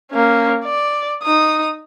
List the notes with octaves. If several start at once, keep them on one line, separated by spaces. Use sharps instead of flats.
A#3 C#4
D5
D#4 D#6